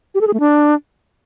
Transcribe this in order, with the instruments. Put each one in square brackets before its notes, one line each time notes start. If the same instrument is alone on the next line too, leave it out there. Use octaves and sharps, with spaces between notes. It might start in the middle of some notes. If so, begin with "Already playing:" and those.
[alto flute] G4
A4
G#4
A3
D4